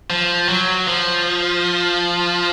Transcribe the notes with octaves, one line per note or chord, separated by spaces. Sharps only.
F3
F#3
F3